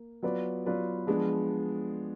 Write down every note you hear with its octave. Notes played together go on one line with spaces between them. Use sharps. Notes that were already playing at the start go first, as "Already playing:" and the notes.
Already playing: A#3
F#3 B3 F4 B4 D5
F#3 B3 F4 B4 D5
F3 G#3 B3 D4